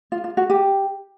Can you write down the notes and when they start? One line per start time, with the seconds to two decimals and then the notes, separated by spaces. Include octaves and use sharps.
0.12 F4
0.24 F4
0.37 F#4
0.50 G4